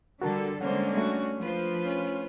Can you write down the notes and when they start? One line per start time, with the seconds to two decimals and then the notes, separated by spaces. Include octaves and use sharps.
0.22 D3 G3 F#4 A4 A#4 A5
0.61 D3 G3 G#3 A#3 C#4 C5 F#5
0.94 A3 D4 F#4
1.39 F3 F4 B4 C5
1.85 C#4